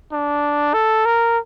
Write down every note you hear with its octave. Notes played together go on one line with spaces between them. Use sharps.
D4
A4
A#4